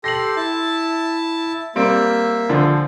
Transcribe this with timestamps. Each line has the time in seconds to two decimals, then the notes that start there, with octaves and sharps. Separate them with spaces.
0.04 G4 A4 C6 A#6 C7 F#7
0.36 E4 A5
1.76 G3 A#3 C4 E5 D7
2.49 A#1 D3 F3